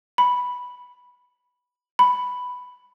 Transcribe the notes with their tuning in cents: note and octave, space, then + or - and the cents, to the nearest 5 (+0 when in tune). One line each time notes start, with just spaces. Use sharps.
B5 -5
B5 +5